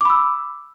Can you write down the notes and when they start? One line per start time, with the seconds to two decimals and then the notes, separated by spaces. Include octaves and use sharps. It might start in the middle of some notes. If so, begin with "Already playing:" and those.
0.01 D6
0.05 B5
0.10 E6